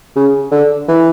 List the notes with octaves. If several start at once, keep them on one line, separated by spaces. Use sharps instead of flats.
C#3
D3
E3